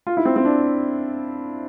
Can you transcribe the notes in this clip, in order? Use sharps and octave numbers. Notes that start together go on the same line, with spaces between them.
F4
E4
C4
C4
D4